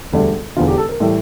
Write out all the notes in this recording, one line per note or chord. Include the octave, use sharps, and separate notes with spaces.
E1 D2 D3 G3
E1 E2 D3 F4
G4
A4
A#4
A2 E3 G3